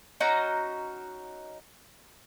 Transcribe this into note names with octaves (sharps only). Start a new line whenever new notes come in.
C#4 D#4 F#4 A#5